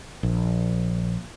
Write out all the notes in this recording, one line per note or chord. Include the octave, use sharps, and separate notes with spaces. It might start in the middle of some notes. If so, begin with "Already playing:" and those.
A#1